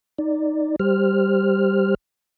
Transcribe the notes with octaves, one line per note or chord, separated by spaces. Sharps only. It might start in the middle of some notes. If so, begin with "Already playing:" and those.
D#4 D5
G3 G4 C5 F6